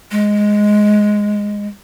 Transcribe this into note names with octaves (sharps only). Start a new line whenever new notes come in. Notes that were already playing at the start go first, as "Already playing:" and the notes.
G#3